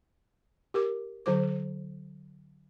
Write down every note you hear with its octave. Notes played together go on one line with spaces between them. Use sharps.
G4 A#4 D6
D3 F#3 C5 D6